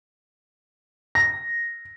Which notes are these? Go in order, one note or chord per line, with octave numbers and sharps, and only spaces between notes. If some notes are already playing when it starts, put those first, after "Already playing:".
A#6